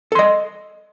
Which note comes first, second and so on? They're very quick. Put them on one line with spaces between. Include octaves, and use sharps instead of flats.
A4 C6 D#5